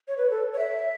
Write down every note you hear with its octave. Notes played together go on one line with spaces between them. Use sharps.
C#5
B4
A4
C#5
E5